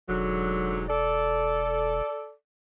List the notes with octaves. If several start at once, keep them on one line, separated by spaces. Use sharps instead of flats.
E1 G#2 D3 F#3
A4 D5